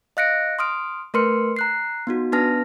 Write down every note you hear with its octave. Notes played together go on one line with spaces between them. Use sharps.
D#5 F5 F#6 A#6 C#7 D7
C6 D#6 F6 D7
A3 A#4 B4 C6 F6 C#7
A#5 F#6 C7
B3 D#4 F#4
B3 D4 B4 A5 F6 A#6